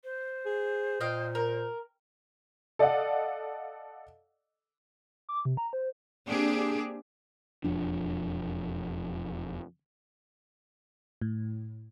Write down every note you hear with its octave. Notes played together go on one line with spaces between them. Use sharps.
C5
G#4
A#2 D#5 F5 G5
A#4
A4 D5 D#5 F5 F#5
D6
C3
A#5
C5
A#3 C4 D4 G4 G#4
E1 F2 F3 D4
A2